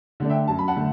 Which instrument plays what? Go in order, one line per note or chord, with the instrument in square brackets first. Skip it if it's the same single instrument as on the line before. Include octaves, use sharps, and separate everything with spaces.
[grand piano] D3 A3 D4
E5 G5
F#2 A5
B5
F#5 A5
D3 A3